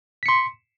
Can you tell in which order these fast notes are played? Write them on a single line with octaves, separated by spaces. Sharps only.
B6 C#7 C6